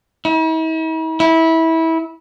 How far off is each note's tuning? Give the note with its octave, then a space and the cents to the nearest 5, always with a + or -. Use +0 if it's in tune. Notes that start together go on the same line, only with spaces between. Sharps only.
E4 -45
E4 -20